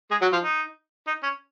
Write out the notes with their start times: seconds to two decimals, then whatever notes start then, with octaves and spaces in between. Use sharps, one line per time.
0.11 G#3 G#4
0.21 F#3 F#4
0.33 F3 F4
0.43 D#4
1.07 D#4
1.23 C#4